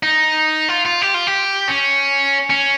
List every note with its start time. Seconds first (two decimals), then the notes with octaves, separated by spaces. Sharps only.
0.03 D#4
0.69 F4
0.85 F4
1.02 G4
1.14 F4
1.27 G4
1.68 C#4
2.50 C#4